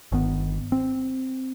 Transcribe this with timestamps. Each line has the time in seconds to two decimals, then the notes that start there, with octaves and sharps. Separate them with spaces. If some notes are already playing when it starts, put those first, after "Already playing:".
0.12 G1 D#3 B3
0.72 C4